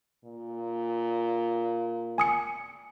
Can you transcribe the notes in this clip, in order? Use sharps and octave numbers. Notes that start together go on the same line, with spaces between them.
A#2
G#5 D#6 C#7